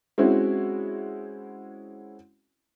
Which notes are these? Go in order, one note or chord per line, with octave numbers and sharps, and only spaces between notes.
G#3 C4 C#4 E4 F#4